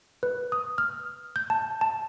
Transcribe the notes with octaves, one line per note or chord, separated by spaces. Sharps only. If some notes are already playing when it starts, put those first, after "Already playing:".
B4
D#6
F6
G6
A5
A5